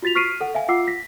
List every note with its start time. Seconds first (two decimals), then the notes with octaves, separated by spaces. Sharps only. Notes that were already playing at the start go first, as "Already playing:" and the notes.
0.02 F4 F#4 A6 B6 F7
0.15 C#6 F6 B6 C7 D7 D#7
0.41 A4 F#5
0.55 E5 F5 G#5
0.68 F4 F#5 D6 E6 C7
0.87 A#6 B6